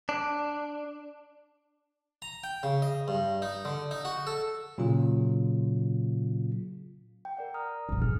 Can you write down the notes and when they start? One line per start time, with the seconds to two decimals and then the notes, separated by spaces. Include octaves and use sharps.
0.09 D4
2.22 A#5
2.44 G5
2.63 C#3
2.82 D#5
3.08 G2
3.42 D#4
3.65 D3
3.91 D#4
4.05 F#4
4.27 A4
4.78 A#2 C#3 F#3 F4
7.25 G5
7.37 A#4 D5 F#5
7.54 A#5 D#6 F6
7.89 F2 A#2
8.02 G#1 G#4 F6